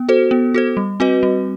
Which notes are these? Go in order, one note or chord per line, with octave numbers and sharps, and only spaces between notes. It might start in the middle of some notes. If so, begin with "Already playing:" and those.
Already playing: B3
F#4 A4 C5
B3
F#4 A4 C5
G3
C4 F#4 B4 D#5
G3